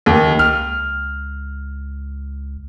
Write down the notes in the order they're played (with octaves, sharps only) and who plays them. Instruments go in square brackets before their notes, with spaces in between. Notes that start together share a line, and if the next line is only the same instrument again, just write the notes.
[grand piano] D#2
[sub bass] C#2 [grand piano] F6